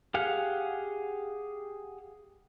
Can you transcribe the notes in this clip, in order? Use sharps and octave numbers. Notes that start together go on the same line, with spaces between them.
G4 G#4 F5 F#5